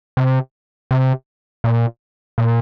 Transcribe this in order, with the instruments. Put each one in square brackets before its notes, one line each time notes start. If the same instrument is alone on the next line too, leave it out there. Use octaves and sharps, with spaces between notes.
[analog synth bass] C3
C3
A#2
A#2